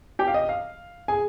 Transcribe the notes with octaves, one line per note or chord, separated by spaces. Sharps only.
G4 G5
F5
D#5
F5
G#4 G#5